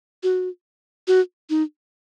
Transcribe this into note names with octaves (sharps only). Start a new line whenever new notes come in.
F#4
F#4
D#4